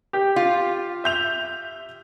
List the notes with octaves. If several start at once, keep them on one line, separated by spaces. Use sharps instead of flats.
G4
F4
E5 G6 F7